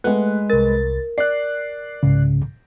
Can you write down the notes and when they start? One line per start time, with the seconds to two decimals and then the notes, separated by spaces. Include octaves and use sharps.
0.04 G#3 A3 B4 F#5
0.50 C2 A#4 A6
1.18 D5 F#6 C7
2.03 C2 G#2 C#3